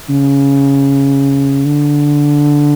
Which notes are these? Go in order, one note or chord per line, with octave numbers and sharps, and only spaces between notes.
C#3
D3